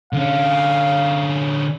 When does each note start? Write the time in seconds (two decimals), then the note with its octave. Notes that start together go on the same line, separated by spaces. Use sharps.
0.13 D3 C#4 F5